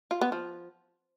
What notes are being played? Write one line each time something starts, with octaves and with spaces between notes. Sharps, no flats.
F4
B3
F3